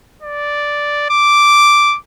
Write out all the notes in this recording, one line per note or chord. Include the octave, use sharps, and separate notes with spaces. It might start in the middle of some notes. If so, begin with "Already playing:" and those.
D5
D6